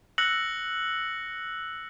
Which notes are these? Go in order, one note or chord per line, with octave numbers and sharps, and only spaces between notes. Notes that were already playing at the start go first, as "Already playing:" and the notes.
E6 F#6 A#6 C#7 F#7